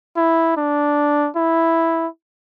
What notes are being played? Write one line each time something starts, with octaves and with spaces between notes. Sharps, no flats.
E4
D4
E4